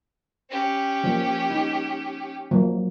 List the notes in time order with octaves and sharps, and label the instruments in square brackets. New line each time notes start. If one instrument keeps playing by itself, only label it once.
[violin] C#4 G4
[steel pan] F3 A#3
D#4
F3 F#3 A#3